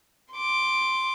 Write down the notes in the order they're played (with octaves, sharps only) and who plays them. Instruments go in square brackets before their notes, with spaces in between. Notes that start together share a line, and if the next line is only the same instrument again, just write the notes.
[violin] C6 D6